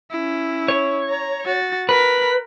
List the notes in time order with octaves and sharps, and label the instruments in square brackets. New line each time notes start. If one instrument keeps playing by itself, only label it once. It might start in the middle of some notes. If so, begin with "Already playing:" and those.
[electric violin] C#4 E4
[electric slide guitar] C#5
[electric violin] A#5
F#4 A6
[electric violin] A#4 B6 [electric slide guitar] B4